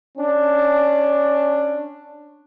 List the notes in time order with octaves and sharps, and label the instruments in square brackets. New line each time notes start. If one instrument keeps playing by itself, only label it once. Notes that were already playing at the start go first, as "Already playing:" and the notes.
[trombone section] C#4 D4